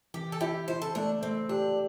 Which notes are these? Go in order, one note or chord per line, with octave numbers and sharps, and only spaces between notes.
E3 G4
A4
E4 G4
E4 C5
A4
A3 D4
A3 C4
D4 G4